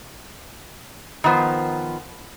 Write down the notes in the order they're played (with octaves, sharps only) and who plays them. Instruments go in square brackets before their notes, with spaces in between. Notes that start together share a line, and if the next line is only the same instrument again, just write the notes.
[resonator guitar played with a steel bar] D#3 F3 B3 C5